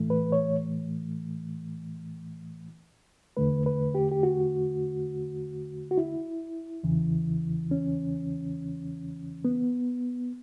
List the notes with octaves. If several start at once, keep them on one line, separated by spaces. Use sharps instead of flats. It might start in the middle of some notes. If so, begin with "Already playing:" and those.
Already playing: A2 E3 A3
B4
C#5
E2 D3 A3 B4
B4
G4
G4
F#4
F#4
E4
E2 C#3 E3
C#4
B3